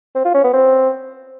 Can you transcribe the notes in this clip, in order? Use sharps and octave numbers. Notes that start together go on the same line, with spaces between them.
C4
F4
C#4
B3
C4